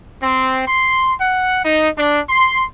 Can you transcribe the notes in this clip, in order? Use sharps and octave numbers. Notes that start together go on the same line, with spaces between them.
C4
C6
F#5
D#4
D4
C6